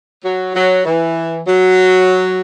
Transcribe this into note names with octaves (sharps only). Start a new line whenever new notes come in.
F#3
F#3
E3
F#3